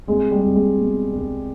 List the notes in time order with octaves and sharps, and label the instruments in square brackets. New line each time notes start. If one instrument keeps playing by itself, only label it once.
[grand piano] C2 G#3
G3
C2
G#3
B2
C2